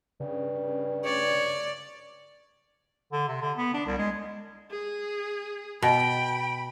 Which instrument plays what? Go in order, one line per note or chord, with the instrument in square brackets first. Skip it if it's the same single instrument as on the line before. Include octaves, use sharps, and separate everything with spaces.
[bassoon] G2 [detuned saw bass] C#3
[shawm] C#5 [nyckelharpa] D5
[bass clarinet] D3
C3
D3
B3
D4
C2
G#3
[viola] G#4
[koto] B2 [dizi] G5 [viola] B5